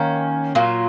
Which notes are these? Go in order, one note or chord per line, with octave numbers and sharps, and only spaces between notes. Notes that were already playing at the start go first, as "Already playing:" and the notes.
Already playing: D#3 A#3 C#4
A#2 F#3 A#3 F4